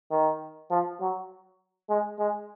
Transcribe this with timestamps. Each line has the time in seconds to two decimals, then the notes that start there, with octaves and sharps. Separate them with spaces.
0.11 D#3
0.70 F3
1.00 F#3
1.89 G#3
2.19 G#3